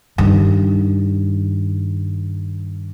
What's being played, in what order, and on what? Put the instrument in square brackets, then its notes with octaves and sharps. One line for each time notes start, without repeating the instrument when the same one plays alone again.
[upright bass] G2 D#3